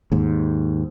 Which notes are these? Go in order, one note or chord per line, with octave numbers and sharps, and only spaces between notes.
D#2 G#2